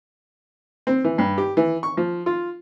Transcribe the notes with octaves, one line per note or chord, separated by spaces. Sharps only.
C4
E3
G2
G4
E3
C#6
F3
F4